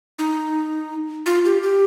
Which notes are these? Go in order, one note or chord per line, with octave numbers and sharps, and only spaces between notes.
D#4
F4
G4
G4